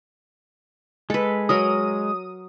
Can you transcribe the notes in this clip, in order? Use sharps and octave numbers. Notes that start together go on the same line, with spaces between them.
G#3 A4 B4
F#3 A#4 D#6